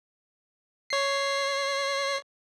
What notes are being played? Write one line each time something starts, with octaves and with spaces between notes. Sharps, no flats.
C#5 C7